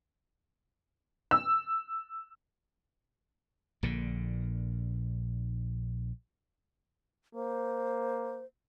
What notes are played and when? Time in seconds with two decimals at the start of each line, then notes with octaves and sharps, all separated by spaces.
1.31 E6
3.83 A#1 A#2 D3
7.35 A#3 C5